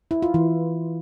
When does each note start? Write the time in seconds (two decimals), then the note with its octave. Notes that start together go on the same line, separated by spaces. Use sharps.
0.11 E4
0.22 F4
0.34 E3